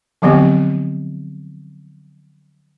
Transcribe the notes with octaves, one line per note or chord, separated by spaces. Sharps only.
D3 F3 F#3 B3 C4 G4